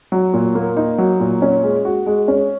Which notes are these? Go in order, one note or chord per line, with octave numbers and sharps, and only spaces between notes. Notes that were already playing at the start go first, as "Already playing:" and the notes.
F#3
A#2
A#3
D#4
F#3
A#2
C#4
G#3
F#4
G#3
C#4